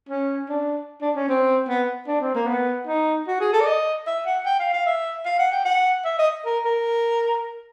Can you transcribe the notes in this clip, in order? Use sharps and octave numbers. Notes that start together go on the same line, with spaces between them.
C#4
D4
D4
C#4
C4
B3
D4
C4
A#3
B3
D#4
F#4
G#4
A4
D5
D#5
E5
F#5
G5
F5
F5
E5
F5
F#5
G5
F#5
E5
D#5
A#4
A#4